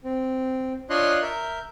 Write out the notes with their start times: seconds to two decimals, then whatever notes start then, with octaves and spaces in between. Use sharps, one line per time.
0.04 C4
0.90 D4 F4 C#5 D#5 C6 F#6
1.22 A#4 E5 G6